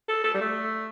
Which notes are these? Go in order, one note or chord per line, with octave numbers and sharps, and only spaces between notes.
A4
A4
G3
A3